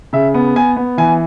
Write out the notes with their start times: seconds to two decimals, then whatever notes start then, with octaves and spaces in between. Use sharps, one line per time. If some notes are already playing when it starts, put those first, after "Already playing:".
0.13 C#3 E5
0.34 B3
0.56 B3 G#5
0.76 B3
0.98 E3 G#5